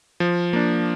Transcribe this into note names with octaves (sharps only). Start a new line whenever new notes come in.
F3
A#3 D4